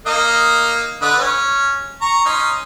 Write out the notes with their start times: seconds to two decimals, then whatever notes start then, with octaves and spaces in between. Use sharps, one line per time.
0.06 A#3 D#4 D#5
1.02 D3 B4 D#5
1.19 C#4
2.01 A#5 C#6
2.26 C#4 D#4 C6